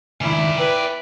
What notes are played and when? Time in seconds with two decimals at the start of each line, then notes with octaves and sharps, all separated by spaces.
0.21 C#2 D#3 E4 D5 G#5
0.57 B4 G5